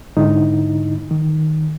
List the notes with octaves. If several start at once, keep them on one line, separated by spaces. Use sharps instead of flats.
G#2 D3 D#4 E4
D#3